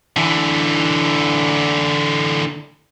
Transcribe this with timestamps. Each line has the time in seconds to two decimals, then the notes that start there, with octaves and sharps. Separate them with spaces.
0.17 D3 E3